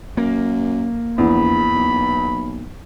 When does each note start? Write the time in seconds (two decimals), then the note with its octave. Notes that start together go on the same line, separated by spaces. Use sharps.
0.17 F#2 A#3
1.18 A#1 E2 B5
1.75 B1